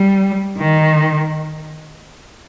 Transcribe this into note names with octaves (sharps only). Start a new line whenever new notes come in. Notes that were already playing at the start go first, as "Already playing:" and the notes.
Already playing: G3
D#3